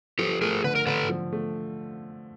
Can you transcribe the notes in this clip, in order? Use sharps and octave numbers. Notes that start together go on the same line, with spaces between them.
F3 G4 A4
A3 G#4 A#4
D3 B4
A#4
D3 A4 B4
F3
A3